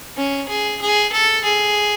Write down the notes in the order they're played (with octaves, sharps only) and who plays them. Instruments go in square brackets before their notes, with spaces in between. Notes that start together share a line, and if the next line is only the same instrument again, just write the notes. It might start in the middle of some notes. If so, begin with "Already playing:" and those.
[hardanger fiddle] C#4
G#4
G#4
A4
G#4